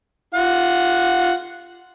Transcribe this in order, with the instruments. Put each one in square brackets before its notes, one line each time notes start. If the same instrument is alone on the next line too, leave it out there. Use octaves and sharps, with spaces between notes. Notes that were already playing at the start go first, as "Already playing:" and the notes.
[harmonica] F4 F#5